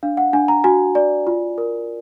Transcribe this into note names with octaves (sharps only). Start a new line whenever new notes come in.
D4 F5
F#5
D4 G#5
A#5
F#4 G#5
D5
F4
A#4